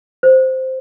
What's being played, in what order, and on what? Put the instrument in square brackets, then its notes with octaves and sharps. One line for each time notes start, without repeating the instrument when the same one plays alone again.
[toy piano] C5